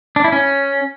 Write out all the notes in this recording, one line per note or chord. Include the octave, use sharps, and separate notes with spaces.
D4
E4
C#4